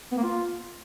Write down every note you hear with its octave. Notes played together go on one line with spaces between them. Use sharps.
B3
A#3
F4